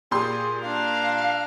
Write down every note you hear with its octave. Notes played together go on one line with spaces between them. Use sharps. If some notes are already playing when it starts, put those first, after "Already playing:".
A#2 G4 G#4 C6
D4 F5 A#5